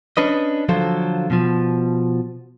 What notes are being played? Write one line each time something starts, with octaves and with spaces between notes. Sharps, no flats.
C#4 D4 B4 D#5
D3 F3 F#3 F4 A4 C5
B2 F3